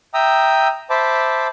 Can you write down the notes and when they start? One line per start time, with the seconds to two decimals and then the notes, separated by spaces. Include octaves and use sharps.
0.14 E5 G5 A#5 D#6 E6
0.90 C5 E5 A5 B5 D6